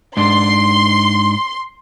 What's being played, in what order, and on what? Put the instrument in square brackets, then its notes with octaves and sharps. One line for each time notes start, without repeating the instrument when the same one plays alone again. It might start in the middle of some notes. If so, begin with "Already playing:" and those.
[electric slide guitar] G#2 D4 [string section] C6